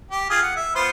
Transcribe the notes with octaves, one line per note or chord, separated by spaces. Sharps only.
G4
F4 G#4
F#5
E5
B3 F4 C5